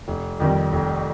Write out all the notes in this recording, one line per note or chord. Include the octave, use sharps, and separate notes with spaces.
F1
F2 D#3 G3
F1